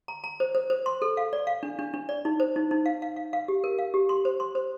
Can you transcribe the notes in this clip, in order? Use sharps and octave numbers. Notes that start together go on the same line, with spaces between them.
A#5
A#5
C5
C5
C5
C6
A4
F5
D5
F5
D4
D4
D4
D5
D#4
C5
D#4
D#4
F5
F5
F5
F5
G4
A#4
F5
G4
C6
C5
C6
C5